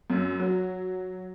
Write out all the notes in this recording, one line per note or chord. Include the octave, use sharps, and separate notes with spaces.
F#2
F#3